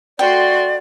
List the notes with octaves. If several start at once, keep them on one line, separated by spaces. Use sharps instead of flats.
A3 F#4 D5 G5 C6